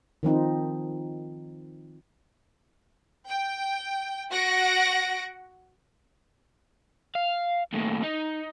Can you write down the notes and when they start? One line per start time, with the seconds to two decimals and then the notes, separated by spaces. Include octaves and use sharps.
0.23 D#3 F3 C4 D#4
3.27 G5
4.32 F#4 F#5 A#6 D7
7.15 F5
7.73 D#2 A2
8.03 D#4